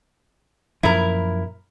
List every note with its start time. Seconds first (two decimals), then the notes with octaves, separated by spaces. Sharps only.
0.83 F#2 A#2 F3 E4 A#4